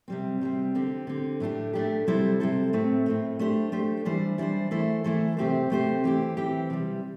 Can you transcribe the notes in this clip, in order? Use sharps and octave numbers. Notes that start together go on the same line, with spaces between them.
C3 G3 C4
C3 G3 C4
D3 C4 G4
D3 C4 G4
A2 A3 D4 G4
A2 A3 D4 G4
C3 G3 E4 A4 C5
C3 G3 E4 A4 C5
A2 A3 C4
A2 A3 C4
A3 D4 G4 C5
A3 D4 G4 C5
E3 G3 D4 C5
E3 G3 D4 C5
E3 A3 E4 A4 C5
E3 A3 E4 A4 C5
C3 A3 C4 G4 C5
C3 A3 C4 G4 C5
E3 C4 G4
E3 C4 G4
C3 E3 G3